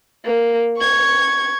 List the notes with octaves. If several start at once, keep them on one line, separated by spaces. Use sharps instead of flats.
A#3
C#6 G#6